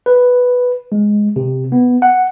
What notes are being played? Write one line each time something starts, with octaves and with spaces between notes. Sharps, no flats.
B4
G#3
C3
B3
F#5